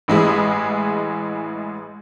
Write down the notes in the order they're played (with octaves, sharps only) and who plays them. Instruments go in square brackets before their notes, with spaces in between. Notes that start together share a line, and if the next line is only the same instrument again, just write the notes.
[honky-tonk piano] A1 G#3 E4 G#4